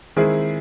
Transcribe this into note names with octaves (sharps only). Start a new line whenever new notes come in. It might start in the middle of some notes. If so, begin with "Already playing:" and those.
D#3 G#3 C4 E4 G#4